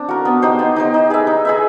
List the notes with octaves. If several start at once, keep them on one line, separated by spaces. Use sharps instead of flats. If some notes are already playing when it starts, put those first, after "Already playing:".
Already playing: C4 D4
F#4 A#4
B3
D#4 G4 C5
B3
D#4 G4 C5
D#4
G#4 B4 E5
D#4
G#4 B4 E5